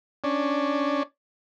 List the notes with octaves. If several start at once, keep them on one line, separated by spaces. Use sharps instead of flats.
C#4 D4